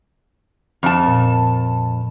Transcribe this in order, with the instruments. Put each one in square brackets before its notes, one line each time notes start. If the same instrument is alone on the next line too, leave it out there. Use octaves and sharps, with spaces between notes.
[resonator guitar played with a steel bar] F2 A5
[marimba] A#2